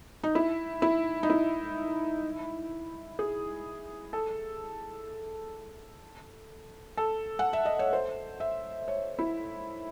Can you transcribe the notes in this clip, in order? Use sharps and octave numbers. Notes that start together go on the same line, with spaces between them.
D#4
E4
E4
D#4
E4
G#4
A4
A4
F#5
E5
D#5
C#5
C5
E5
C#5
E4